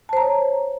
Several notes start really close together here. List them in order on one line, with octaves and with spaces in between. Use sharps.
A5 C5 A#5 C#5